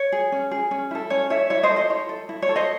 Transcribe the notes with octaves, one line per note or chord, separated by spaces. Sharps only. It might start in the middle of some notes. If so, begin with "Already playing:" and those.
Already playing: C#5
G#4
C#4
G#4
C#4
E4 A4
C#4 C#5
E4 A4 C#5 E5
E4 C#5 E5
C5 D#5
A4
C5 D#5
E4 C#5
A4
E4
C#5
A4
C5 D#5